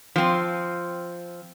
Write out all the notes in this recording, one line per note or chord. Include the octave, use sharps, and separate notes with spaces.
F3 C4